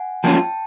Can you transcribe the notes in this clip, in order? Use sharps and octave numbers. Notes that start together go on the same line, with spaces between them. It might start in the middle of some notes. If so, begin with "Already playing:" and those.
Already playing: F#5 G#5
F3 A#3 C#4 F4 G5 A5